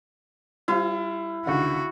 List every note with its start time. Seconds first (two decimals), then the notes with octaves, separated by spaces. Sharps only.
0.68 G3 E4 F4 C5
1.46 C#2 D3 D#3 F#4